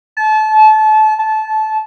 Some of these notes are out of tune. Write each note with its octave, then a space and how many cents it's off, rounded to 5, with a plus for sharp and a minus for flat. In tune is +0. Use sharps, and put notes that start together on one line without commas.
A5 -30
A5 -20